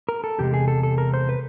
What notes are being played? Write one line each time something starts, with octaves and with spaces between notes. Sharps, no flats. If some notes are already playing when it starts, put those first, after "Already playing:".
A#4
A4
E2 C3 G#3 G4
G#4
A4
A4
A#4
C5
B4